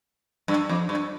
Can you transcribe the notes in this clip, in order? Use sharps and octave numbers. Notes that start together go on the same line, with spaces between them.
G2
F2
G2